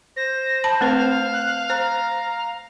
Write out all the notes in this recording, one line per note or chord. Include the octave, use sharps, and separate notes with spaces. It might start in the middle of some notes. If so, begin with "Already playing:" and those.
C5 A#6
A5 B5
A3 C4 B4 F5
F#6
C5 A#5